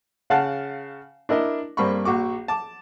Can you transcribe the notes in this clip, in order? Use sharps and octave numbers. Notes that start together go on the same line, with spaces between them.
C#3 F5 F#5 A5 F6 F#6
D4 E4 A#4 D#5
G2 A#3 C4 B5 C#6
A#1 F#4 C#6 D6
A5 D6